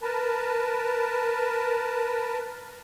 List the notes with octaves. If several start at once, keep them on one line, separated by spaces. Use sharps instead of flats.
A#4 B4 A5